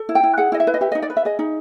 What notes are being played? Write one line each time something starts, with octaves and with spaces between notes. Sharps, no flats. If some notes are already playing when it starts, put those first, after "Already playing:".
Already playing: A4
E4
G5
E4
G#4 F#5
E4 D#5
E5
B4
D#5
G4 E5
D#5
D#4
D5
B4
E5
G#4 D#5
D#4